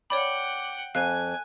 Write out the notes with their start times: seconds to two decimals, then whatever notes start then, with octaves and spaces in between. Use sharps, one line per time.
0.10 C#5 D5 F#5 G5 B5 D6
0.95 F2 F5 G#5 F#6